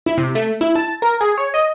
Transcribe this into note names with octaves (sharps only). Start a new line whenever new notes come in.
E4
C3
A3
E4
A5
A#4
G#4
C#5
D#5